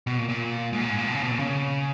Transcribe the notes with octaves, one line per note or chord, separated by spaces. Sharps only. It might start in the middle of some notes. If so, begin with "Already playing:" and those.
B2
A#2
A#2
G#2
A#2
G#2
A#2
B2
C#3
B2
A#2
C#3